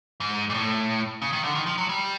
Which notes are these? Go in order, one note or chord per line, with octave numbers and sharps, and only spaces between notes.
G#2
A#2
A2
C#3
D#3
D3
D#3
F3
F#3
G3